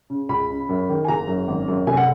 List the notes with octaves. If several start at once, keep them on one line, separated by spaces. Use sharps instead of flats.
C#3
C#2 B5
C#3
F#2
D#3
G#5
F#1 A#5
F#2
G#1
F#2
F1 G#5
F#5